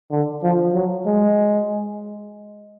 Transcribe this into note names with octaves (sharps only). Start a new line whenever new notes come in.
D3
F3
F#3
G#3